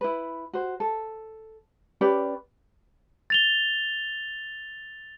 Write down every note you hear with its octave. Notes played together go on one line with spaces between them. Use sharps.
E4 B4
F#4 C5
A4
C#4 G4 B4 D5
A6 F7 G7